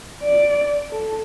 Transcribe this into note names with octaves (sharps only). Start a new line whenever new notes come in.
D5
A4